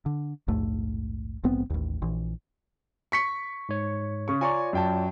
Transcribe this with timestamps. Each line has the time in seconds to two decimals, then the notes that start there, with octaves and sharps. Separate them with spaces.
0.06 D3
0.48 A#1 D#2 G#2 A3
1.44 A#1 G#2 B3 C4
1.70 A1 D#2
2.02 A#1 E3
3.12 C#6 B6 C#7
3.69 G#2 C#5
4.28 C#3 C#6
4.41 F4 C#5 D5 G#5 A#5 C#6
4.73 F#2 G5 A5